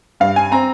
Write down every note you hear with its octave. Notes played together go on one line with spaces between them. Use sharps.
G2 F5
G#5
C4 A#5